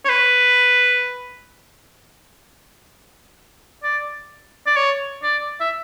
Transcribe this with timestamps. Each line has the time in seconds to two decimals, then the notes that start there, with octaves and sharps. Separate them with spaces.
0.05 C#5
0.09 B4
3.83 D5
4.66 D5
4.76 C#5
5.23 D5
5.61 E5